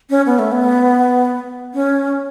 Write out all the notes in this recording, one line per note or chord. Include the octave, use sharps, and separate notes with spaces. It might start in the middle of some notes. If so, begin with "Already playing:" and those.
C#4
B3
A3
B3
C#4